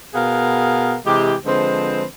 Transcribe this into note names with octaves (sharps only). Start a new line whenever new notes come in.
B2 B3 G#4 A#4 F5
C3 E3 G#3 G4
D3 F3 G#3 C4 B4 C5